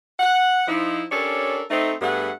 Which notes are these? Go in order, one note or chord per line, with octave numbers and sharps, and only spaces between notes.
F#5
F3 D#4 E4
C#4 D4 G4 A4 A#4 C#5
A3 C4 D#4
G2 A3 B3 G#4 F#5